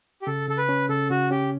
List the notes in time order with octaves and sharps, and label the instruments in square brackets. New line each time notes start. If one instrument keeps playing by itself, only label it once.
[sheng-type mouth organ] G4
[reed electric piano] C#3 [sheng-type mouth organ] A4
[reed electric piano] C#3 [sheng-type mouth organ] A4
[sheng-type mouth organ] B4
[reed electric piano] C#4
[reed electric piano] C#3 [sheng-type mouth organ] A4
[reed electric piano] C#3 [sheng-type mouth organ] F#4
[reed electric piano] C#4 [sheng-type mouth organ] G4